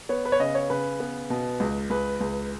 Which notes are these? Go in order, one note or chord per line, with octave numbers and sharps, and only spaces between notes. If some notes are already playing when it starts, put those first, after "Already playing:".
B3 C#5
B4
C#5
C#3 D#5
C#5
C#3 B4
B3
B2
C#2
C#2 B4
C#2